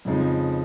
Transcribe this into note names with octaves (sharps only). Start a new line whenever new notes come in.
F2 C#3 F3 G#3 D#4